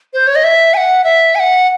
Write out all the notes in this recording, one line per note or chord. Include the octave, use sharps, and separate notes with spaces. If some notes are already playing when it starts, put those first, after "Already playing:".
C5
C#5
D#5
E5
G#5
F#5
E5
G#5
F#5